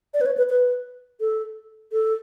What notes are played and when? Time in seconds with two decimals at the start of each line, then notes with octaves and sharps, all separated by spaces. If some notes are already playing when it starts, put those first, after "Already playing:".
0.14 D5
0.21 B4
0.26 C#5
0.37 B4
0.50 B4
1.20 A4
1.92 A4